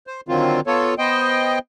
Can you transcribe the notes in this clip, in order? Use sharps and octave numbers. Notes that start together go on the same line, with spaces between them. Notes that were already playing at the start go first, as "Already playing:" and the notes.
C5
D3 D#3 F#3 C4 F4
B3 F4 A4 C#5
B3 C5 D#5 G5